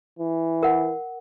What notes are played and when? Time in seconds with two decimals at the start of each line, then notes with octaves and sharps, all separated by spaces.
0.19 E3
0.63 A#4 F#5